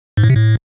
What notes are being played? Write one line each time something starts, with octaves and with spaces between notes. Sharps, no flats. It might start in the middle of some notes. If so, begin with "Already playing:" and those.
G#2
A2
C3
A2